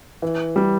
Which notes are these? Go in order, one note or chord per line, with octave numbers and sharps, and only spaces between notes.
E3
G3